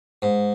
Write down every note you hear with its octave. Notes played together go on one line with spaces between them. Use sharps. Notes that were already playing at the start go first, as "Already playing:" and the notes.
G#2